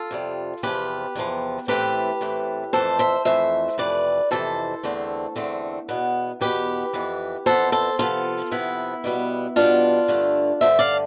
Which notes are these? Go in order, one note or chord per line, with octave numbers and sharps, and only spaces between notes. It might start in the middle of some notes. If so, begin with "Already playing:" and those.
Already playing: F4 A4
F2 C3 G3
E2 C3 F3 G4 B4
E2 C3 F3
A2 E3 A3 C4 G4 B4
A2 E3 A3 C4
F2 E3 A3 A4 C5
C5 E5
F2 E3 A3 C5 E5
F2 C3 E3 A3 B4 D5
F2 C3 E3 A3 A4 C5
E2 D3 A3 C4
E2 D3 A3 C4
E2 B2 B3
E2 B2 B3 G4 B4
F2 E3 B3
F2 E3 B3 A4 C5
A4 C5
C3 F3 B3 F4 A4
C3 F3 B3 E4
B2 G3 B3
B2 G3 B3 D4 F4
G2 D3 A3
G2 D3 A3 C5 E5
D5 F5